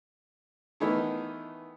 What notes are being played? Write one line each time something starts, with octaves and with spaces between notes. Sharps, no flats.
D#3 E3 A3 B3 D#4